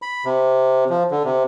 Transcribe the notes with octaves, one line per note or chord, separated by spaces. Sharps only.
B5
C3
F3
D3
C3